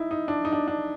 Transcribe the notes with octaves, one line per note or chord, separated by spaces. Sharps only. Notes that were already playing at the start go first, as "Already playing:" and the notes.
Already playing: D#4 E4
D#4
D4
D#4
D4
D4